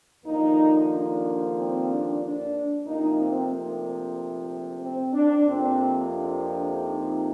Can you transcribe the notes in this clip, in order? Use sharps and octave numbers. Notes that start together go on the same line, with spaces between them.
D#2 D3 F3 A#3 D#4
D4
C4
D4
D4
D2 C3 F3 A#3 D#4
C4
A#3
C4
D4
F2 C3 F3 A#3 C4
D4
D#4